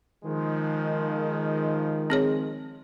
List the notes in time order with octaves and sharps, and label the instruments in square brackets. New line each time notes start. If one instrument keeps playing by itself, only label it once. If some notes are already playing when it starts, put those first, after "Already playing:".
[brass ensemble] D#3 F3 G#3
[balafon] C4 G#4 C#5